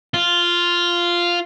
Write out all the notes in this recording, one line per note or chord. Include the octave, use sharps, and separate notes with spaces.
F4